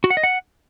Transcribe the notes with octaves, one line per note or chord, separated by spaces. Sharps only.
F#4
F#5
D#5
F#5